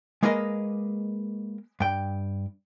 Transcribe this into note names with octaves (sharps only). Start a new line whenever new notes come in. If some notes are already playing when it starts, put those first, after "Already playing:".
G#3 A#3 G#4 A#4 B4 D#5
G2 G5